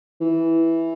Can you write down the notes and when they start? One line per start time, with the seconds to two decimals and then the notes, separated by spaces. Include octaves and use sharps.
0.21 E3